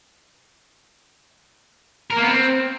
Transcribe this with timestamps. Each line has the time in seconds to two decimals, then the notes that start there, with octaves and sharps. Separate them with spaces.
2.10 A#4
2.16 A#3
2.22 B3
2.28 C4